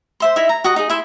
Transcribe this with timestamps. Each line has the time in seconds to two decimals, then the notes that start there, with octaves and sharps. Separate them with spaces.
0.20 C5 E5 C6
0.36 D#4 E4 E5
0.49 A#5
0.64 F#4 D#5
0.76 D#4 G#4
0.90 E4 E5 C6